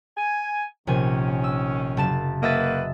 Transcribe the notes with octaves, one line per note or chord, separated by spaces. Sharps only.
G#5
A#1 C3 D#3 C#4 G#5
E6
F#1 A5 E7
A#3 F#4 B4 D#5 E5 A6